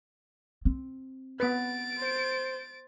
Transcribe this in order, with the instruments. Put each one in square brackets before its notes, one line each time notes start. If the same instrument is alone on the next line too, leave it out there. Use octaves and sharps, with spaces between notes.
[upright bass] C4
[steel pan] B3 B4 [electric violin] A6 D7
[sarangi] C5